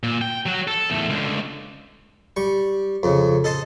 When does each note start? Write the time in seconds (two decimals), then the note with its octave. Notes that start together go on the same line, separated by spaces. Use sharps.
0.03 A#2
0.22 G5
0.46 F#3 F#4
0.68 A4
0.90 E2 A3
1.10 C#2 D3
2.36 G3 C#6
3.03 F2 C#3
3.44 A4 D#5 A5 C6